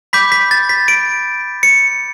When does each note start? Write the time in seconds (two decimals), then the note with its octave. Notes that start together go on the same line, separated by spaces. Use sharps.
0.13 B5 D6 G6 B6
0.32 B6
0.51 A6
0.69 B6
0.88 D7
1.63 C#7